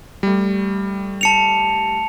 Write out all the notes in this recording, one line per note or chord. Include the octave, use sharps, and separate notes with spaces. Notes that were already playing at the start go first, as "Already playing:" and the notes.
G3 A3
A5 C#7 F7